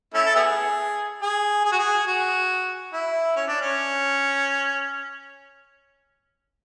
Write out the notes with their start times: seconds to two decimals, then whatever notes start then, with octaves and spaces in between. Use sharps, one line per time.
0.14 A3 C#4 E4
0.26 A4
0.35 B3 E4 G#4
1.22 G#4
1.64 G#4
1.72 F#4
1.79 G#4
2.07 F#4
2.93 E4
3.36 C#4
3.48 D4
3.60 C#4